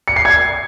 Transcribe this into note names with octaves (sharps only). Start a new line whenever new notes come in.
C#7
C7
G#6